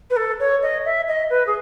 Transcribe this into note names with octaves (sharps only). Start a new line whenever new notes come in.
B4
A4
C#5
D#5
E5
D#5
B4
G#4